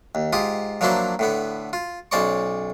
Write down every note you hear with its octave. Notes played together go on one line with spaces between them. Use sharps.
D#2
G#2 F4 G4 D#6
F3 F#3 A#3 D4 E4 C5
A2 D3 B3
F4
B1 C#4 C5 D5 A#5 C#6